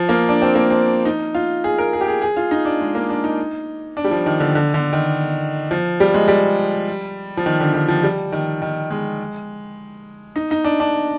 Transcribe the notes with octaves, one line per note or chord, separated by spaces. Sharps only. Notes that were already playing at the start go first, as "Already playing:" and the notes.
Already playing: F3
A#3
D4
C4
A#3
C4
D#4
F4
G#4
A#4
G#4
G4
G#4
G#4
F4
D#4
D4
G#3
A#3
D4
D#4
D4
G3
F3
D#3
D3
D3
D3
D#3
F3
G3
G#3
G3
F3
D#3
D3
D#3
F3
G3
D#3
D#3
G#3
D#4
D#4
D4
D4